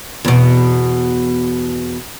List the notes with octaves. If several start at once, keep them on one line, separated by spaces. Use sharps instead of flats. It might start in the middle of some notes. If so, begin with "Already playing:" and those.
E2 B2